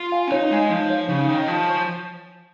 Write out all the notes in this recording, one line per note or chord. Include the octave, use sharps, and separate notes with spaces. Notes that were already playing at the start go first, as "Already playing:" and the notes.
Already playing: F4
F5 G#5
C#4
D#4 C#5
G#3 F5 G#5
F3 D#4
C#5 F5
C#3 D#4
D#3 C#5 F5
F3 F4
C#5 G#5 C#6